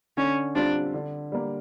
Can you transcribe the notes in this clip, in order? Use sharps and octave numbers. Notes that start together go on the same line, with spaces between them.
D3 C#4
G3 C4 D4 F4
D3
G3 A#3